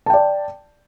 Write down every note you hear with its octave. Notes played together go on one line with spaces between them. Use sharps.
D5 G5 A5